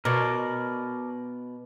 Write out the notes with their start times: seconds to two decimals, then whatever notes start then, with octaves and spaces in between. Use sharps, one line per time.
0.05 B2 A#4 C#5 D5